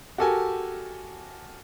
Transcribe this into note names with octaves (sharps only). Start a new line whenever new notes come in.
F#4 G4 A4 A#4 G#5